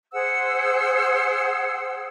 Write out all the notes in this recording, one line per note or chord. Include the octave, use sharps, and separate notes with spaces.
G#4 C5 F#5 E6